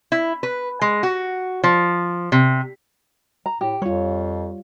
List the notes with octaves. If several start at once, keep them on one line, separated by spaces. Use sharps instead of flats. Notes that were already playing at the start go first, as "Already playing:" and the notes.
E4
B4
G#3
F#4
F3
C3
A#5
A2 G4
F2 G3 F4 C#5